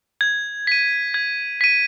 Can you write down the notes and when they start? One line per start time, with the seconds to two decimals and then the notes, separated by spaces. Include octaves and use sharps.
0.21 G#6
0.67 B6 D#7
1.14 G#6
1.61 B6 D#7